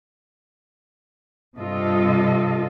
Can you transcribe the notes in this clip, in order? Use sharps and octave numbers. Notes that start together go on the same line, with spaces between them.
G2 C3 F4 A4 D#5